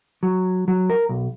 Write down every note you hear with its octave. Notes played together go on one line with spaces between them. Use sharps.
F#3
F#3
A#4
B1